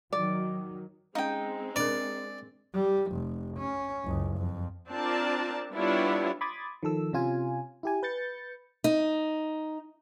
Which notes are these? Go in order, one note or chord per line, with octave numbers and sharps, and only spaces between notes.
D#3 F#3 D5
G#3 C4 C#4 D#4 F5 G5
D4 A#4 D5
G3
F1
C#4
F#1 C#2
F2
C4 D4 F4 A#4 D5 A5
G3 B3 D4 E4 F4 C#5
B5 C6 D6 D#6 G#6 A6
D#3 F3 A4 E6
C3 C#4 F4 G#5
E4 G4 G#5
B4 G6 A6 C#7
D#4